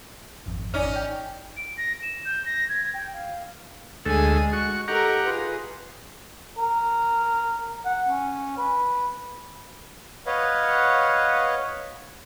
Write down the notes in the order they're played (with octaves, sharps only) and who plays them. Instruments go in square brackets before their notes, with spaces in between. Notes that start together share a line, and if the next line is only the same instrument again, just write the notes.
[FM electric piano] G#1 F2
[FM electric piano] G#1 D5 F6 [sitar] C#4 D#4
[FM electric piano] G5
[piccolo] D7
A#6
E7
G6
A#6
G#6
G5
F5
[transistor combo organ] D2 A4 [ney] G#3 [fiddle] G#4 G#5
[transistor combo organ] F#4 [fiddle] C#6
[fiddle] D#4 A#4 [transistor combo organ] G4 F#5 A#5 [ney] A4
[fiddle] F4 G#4 [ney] B4
[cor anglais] A#4
F#5
C#4
B4
[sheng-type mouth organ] B4 C#5 D#5 F5 F#5